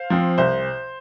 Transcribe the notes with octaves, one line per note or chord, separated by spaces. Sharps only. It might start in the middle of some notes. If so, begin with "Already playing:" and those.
Already playing: C5 F5
F3 C4
C2 C5